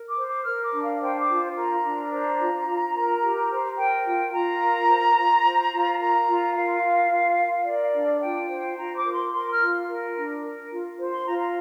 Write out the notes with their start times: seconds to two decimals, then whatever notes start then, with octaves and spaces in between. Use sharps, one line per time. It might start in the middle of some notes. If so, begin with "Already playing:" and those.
Already playing: A#4
0.08 D6
0.17 C5
0.27 D6
0.45 A#4 F6
0.64 D6
0.73 D4
0.82 F5
1.00 C5 G5
1.19 D6
1.29 F4
1.56 A#4 A#5
1.84 D4
2.12 C5 A#5
2.39 F4
2.67 F4
2.95 A#4
3.22 G4
3.50 C5
3.78 A#4 G5
4.06 F4
4.33 F4 A#5
4.61 A#4
4.89 C5
5.17 F4
5.44 C5
5.72 F4
5.99 A#4 A#5
6.28 F4
6.55 A#4 F5
6.82 F4
7.10 F4
7.38 A#4
7.66 A#4 D5
7.93 D4
8.21 F4 G5
8.49 C5
8.77 F4 A#5
8.96 D6
9.04 A#4
9.14 C6
9.32 A#4 C6
9.50 F6
9.60 F4
9.87 A#4
10.15 D4
10.43 A#4
10.71 F4
10.99 C5
11.12 C6
11.26 F4 A#5
11.41 A#5